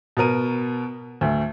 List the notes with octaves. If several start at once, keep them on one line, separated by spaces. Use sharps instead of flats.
B2 B3 A#4 D#7
D2 A3